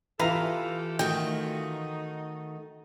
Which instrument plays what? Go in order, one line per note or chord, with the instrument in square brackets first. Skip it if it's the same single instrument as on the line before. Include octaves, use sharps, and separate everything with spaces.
[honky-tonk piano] E3 F4 [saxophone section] G4 A4 [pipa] B4 F5 A#5
[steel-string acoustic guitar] D#3 A3 F#4 [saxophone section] D#4 [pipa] G5